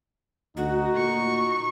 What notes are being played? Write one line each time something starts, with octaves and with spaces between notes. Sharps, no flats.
D2 D#4 F#4
A#2 C#6